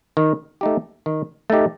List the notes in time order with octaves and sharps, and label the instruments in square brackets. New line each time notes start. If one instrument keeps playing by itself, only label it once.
[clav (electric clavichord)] D#3
A3 D#4 G4
D#3
A3 D#4 G4